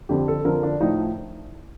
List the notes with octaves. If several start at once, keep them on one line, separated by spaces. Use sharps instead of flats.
F2 D3 F3 G4
A4
F2 D3 F3 A#4
D4
A2 F3 D#4